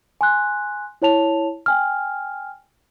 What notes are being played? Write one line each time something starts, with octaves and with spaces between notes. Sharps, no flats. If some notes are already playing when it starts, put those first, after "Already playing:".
G#5 C6 F#6
E4 C#5 A5 F7
G5 G#5 F6